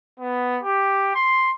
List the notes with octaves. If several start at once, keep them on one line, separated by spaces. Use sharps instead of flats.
B3
G4
C6